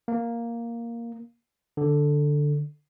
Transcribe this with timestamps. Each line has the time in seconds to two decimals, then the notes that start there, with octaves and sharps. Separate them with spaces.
0.08 A#3
1.77 D3